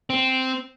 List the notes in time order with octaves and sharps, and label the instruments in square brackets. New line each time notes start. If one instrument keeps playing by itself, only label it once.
[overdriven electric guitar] C4